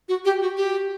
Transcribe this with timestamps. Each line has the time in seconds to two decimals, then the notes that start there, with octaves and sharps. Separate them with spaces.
0.09 F#4
0.25 G4
0.42 F#4
0.57 G4